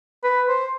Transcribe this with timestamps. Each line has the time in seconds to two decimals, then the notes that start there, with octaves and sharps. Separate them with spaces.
0.24 B4
0.48 C5